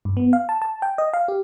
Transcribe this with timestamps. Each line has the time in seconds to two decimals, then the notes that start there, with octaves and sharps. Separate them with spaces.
0.05 G2
0.17 B3
0.33 F5
0.49 A5
0.62 A5
0.82 G5
0.98 D#5
1.13 F5
1.28 G4